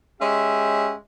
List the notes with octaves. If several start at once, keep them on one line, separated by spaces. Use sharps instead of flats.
G#3 C#4 G4 E5